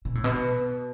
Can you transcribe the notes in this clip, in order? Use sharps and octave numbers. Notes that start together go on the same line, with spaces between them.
B2
A2
B2